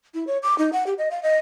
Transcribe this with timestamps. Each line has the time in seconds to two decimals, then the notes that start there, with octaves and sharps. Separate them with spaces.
0.14 E4
0.27 C#5
0.43 D6
0.58 D#4
0.73 F#5
0.87 G4
0.98 D#5
1.11 F5
1.23 D#5